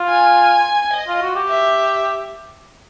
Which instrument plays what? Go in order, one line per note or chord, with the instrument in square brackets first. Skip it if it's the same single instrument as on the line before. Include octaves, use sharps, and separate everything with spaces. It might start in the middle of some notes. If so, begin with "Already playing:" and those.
Already playing: [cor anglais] F4
[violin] G#5
D#5
[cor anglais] F4
F#4
G4
[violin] E5